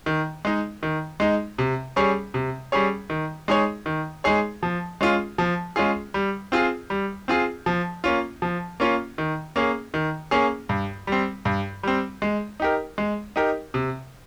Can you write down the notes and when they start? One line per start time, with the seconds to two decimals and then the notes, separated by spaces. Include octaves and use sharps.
0.06 D#3
0.45 G#3 D#4
0.83 D#3
1.20 G#3 D#4
1.58 C3
1.96 G3 C#4 G#4 C#5
2.34 C3
2.72 G3 C#4 G#4 C#5
3.10 D#3
3.48 G#3 D#4 G#4 C#5
3.86 D#3
4.24 G#3 D#4 G#4 C#5
4.63 F3
5.01 G#3 C#4 F4 G#4
5.38 F3
5.76 G#3 C#4 F4 G#4
6.14 G3
6.52 C4 F4 G#4
6.90 G3
7.28 C4 F4 G#4
7.66 F3
8.04 A#3 C#4 F4
8.42 F3
8.80 A#3 C#4 F4
9.18 D#3
9.56 A#3 C#4 G#4
9.94 D#3
10.31 A#3 C#4 G#4
10.69 G2
11.07 G3 C4
11.45 G2
11.83 G3 C4
12.22 G#3
12.60 D#4 G4 A#4
12.98 G#3
13.36 D#4 G4 A#4
13.74 C3